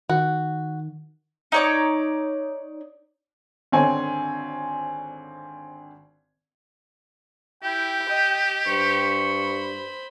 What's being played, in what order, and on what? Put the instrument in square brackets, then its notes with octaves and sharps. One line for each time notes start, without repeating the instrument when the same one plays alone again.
[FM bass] D#3 [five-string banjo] F#4
[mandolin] D#4 C#5 D5
[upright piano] G#1 D3 C4 C#5 G#5
[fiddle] E4 [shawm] G4 [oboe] G5
[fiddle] D#5 [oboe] G5
[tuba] G2 [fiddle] C5 B5 [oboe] C#6